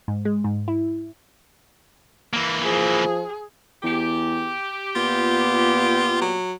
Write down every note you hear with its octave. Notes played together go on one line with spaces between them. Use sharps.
G#2
G#3
G#2
E4
E3 A#3
F3 G#4
E2 G4
A#2 B3 F4
F#3